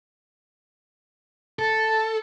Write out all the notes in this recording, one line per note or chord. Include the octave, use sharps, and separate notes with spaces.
A4 A5